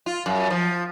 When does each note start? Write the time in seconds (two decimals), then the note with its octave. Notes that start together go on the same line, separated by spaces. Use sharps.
0.06 F4
0.26 F#2
0.50 F3